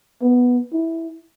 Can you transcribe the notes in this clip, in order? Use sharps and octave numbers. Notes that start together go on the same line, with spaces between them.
B3
E4